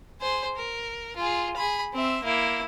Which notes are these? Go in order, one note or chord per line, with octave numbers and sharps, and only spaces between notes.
G#4 C5
A#4
F4 G#4
G#4 B5
C4 E5
A#3 E4